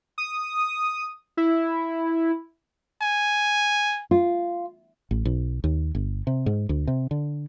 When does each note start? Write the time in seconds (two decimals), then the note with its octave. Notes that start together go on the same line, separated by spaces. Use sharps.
0.18 D#6
1.37 E4
3.02 G#5
4.11 F4
5.11 A1
5.25 B1
5.64 D#2
5.95 G1
6.27 C3
6.46 G#2
6.69 D2
6.87 C3
7.11 D3